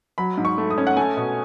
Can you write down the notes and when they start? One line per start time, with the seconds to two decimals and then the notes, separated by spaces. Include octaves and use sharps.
0.18 F#3 B5
0.38 G#2
0.45 C#6
0.58 A3
0.70 D#6
0.78 C#4
0.87 F#5
0.97 A3 G#5
1.17 B2